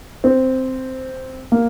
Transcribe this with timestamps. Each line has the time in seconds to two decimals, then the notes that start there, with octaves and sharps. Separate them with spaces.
0.24 C4
1.52 A#3